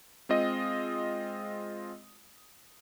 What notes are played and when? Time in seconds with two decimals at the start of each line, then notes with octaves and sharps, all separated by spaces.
0.29 G#3 C4 F4 D#5 D#6 D#7